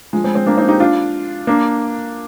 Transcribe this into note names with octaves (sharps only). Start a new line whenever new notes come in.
F3 G#3
G#3 C4
G#3 C4
A#3 D4
C4 D#4
D#4 G4
D4 F4
A#3 D4